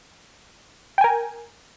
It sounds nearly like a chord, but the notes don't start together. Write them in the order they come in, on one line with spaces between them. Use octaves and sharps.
G5 G#5 A#4